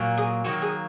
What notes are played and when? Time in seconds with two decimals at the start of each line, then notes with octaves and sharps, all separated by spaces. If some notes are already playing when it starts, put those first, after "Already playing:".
Already playing: A#2 F#3 A#3
0.17 G#4
0.44 D#3 F#3 A#3 F#4
0.62 G#4